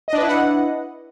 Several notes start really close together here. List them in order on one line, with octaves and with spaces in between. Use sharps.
D#5 D4 B4 E4 F#5